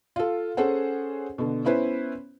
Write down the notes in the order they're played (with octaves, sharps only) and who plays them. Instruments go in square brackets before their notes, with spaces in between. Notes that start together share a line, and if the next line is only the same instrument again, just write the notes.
[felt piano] F4 A4
C#4 G#4 A4 C5 F#5
B2 D3
B3 C#4 E4 B4 C5